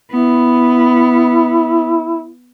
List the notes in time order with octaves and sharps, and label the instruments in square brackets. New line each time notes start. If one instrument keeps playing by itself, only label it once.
[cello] B3 [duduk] E4